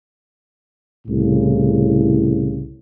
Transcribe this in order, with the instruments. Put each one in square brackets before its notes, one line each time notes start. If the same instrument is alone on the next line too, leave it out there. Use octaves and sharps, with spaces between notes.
[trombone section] C2 A2 C#3